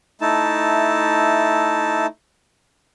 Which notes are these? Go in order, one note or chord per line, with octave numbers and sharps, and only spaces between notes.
A3 D#4 E4 A5